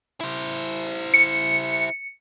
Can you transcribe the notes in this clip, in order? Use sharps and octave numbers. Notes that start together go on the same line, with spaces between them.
E4 C5
C#7